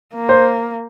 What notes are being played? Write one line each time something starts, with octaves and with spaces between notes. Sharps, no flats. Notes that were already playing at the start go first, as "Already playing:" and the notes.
A#3
C5